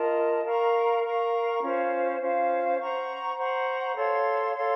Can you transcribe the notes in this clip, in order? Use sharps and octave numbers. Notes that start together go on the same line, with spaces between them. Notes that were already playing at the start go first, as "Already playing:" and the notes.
Already playing: F4 A#4 D#5 A5
A#4 F5 A#5 C#6
A#4 F5 A#5 C#6
C#4 F4 C5 F5
C#4 F4 C5 F5
C5 F#5 A#5 C#6
C5 F#5 A#5 C#6
A4 C#5 F5 C6
A4 C#5 F5 C6